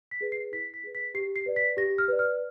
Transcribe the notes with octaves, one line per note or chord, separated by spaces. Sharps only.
B6
G#4 B4
C7
E4 B6
B6
G#4 B4
B6
G4 C7
C7
B4 D5
B6
G4 A#6
F6
B4 D5
F6